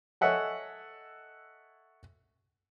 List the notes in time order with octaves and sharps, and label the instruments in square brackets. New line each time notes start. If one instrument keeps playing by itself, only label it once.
[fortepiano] A4 C#5 D#5 E5 F#5 G#5